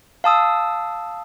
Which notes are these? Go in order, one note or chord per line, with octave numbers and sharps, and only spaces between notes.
F5 A5 D#6 E6